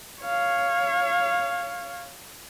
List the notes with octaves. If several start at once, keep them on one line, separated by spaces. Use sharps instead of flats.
C#5 F5